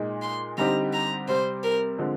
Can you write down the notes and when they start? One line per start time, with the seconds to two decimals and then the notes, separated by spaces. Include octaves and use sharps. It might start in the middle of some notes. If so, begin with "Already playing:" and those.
Already playing: A#2 G#3 D#4
0.22 C6
0.58 D3 G3 C4 D#4 G4 A#5
0.93 A#5
1.28 C3 G3 C4 C5
1.64 A#4
1.98 D3 F3 G#3 C4